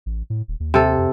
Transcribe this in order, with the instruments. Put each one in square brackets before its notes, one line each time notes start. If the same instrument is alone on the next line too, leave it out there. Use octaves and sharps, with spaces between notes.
[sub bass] A1
A2
D#1
D#2
[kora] C3 A4
[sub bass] F2